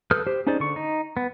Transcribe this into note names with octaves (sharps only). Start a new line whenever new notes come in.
A4 B4 D#6 F6 G6
G4 C5
C#4 D#4 G#4 C5 D5
D3 C#6
D#4
B3